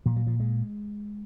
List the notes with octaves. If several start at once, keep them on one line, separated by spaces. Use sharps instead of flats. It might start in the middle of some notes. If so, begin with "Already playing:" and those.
A#2 F3
F#3
F3
G#3